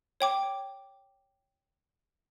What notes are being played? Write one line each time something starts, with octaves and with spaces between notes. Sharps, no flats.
C#5 G5 D6